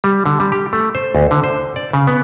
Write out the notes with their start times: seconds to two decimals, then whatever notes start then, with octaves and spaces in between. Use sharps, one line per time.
0.04 G3
0.26 D3
0.40 G3
0.52 G4
0.73 A3
0.95 C5
1.15 D2
1.31 D3
1.44 C5
1.76 D5
1.93 C#3
2.07 B3